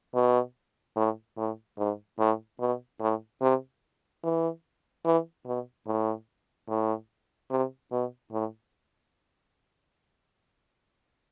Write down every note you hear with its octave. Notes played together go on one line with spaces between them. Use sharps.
B2
A2
A2
G#2
A2
B2
A2
C3
E3
E3
B2
A2
A2
C3
B2
A2